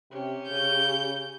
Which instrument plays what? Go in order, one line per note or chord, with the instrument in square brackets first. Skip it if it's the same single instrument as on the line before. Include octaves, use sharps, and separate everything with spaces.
[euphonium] C3 [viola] C#4 G4
[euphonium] C#3 [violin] G6